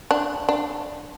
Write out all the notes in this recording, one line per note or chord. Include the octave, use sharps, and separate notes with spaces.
D4
D4